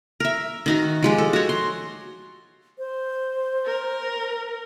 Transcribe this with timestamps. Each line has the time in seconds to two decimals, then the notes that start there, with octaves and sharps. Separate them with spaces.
0.20 A#4 E5
0.66 D#3 D#4 F#4
1.03 F3 G#3 G4
1.18 A4
1.33 F#4 C#5
1.49 C6
2.78 C5
3.66 A#4